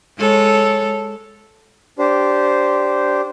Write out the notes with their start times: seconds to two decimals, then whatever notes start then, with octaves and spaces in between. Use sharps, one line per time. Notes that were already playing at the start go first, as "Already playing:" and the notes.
0.18 G#3 A4 C#5
1.99 D4 G4 C5